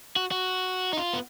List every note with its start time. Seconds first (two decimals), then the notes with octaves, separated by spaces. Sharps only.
0.16 F#4
0.31 F#4
0.93 D#4
0.97 F4
1.13 B3